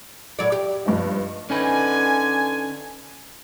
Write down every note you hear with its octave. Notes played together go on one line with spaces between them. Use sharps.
A2 F#3 D5
G4
G2 F3 D#4
D3 C#4 D#4 B4 G#5